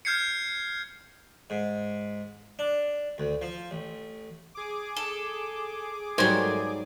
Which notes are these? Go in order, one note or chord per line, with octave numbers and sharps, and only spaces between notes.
F6 G6 G#6 C7 C#7
G#2
D4
D2
F3
A1
G#4 D6
A4
G#2 F#3 G3 A3 A#4 C5 G#5